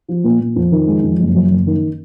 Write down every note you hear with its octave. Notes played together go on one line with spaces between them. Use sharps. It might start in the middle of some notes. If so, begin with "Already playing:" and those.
F3
A#2
A#2
F2
D#3
G#3
F2
F#1
F#2
F#1
D#3